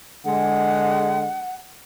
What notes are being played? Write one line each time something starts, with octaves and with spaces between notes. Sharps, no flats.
D3 G#3 F#5